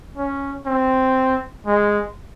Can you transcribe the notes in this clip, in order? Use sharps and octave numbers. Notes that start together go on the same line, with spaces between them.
C#4
C4
G#3